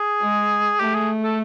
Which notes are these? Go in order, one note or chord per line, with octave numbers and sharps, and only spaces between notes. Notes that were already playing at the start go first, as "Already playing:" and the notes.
Already playing: G#4
G#3
A3 G4
G#4
A4